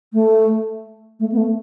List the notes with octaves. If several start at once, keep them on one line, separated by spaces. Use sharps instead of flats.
A3
A3
B3
A3